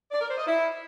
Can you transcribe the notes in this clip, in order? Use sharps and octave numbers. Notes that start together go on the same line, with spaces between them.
D5
A#4
C5
D#5
E4